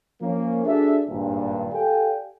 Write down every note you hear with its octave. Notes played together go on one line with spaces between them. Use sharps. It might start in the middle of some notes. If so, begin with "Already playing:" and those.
F3 A#3 C#4
D4 F#4 G#4 A4 E5
G#1 G2 A#2
G4 A4 D5 F5 G5 G#5